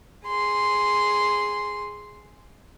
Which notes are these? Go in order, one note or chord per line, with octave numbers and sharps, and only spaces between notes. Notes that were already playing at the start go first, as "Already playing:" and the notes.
G#4 C6